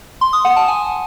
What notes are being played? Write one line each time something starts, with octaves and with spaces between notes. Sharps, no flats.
C6
D#6
F#5
A5
G#5